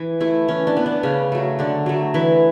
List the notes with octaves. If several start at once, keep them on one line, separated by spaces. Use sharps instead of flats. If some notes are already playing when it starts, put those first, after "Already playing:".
Already playing: E3
A3 E4
E3 C#4
D4
B3
D4
C#3 C#4
F#3 A3
D3 D4
F#3 A3
E3 E4